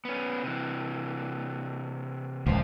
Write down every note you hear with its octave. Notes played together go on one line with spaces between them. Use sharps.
B3 C#4
C3 E3
D#1 C#2 F3 C5